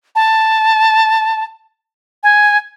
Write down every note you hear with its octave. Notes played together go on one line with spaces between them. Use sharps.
A5
G#5